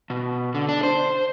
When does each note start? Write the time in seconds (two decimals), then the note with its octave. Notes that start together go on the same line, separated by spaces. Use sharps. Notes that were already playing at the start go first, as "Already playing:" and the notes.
0.10 B2
0.55 D3
0.69 D4
0.83 C5